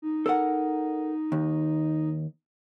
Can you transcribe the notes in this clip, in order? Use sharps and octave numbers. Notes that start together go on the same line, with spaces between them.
D#4
A4 A#4 F#5
D#2